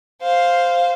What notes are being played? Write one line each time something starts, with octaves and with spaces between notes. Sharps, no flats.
C5 F5